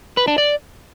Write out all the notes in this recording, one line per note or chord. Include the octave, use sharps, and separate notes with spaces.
B4
D4
D5